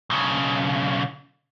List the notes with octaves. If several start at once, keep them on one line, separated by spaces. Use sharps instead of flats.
B1 C#3